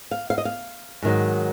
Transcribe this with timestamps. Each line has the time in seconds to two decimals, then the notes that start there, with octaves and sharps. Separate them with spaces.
0.11 F5
0.30 F5
0.38 D#5
0.45 F5
1.02 G#2 D#3 F#3